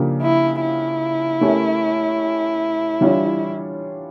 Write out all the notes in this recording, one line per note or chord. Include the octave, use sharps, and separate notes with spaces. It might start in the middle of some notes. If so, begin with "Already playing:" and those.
Already playing: C#3 F3 A#3 D4 G4
E4
E4
A3 C#4 G4 A#4 C#5
E3 G3 D4 F4 C#5